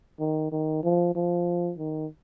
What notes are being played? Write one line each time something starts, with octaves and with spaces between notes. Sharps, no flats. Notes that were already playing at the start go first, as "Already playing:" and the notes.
D#3
D#3
F3
F3
D#3